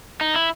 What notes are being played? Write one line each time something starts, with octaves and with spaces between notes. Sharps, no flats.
D#4
E4